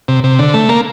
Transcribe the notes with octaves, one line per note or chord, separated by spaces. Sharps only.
C3
C3
D3
A3
A#3